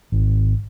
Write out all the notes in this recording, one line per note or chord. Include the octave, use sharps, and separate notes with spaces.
G#1